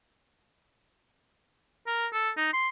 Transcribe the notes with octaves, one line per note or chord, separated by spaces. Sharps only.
A#4
A4
D#4
C6